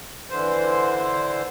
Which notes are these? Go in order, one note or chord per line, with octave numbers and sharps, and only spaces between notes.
D3 E3 C5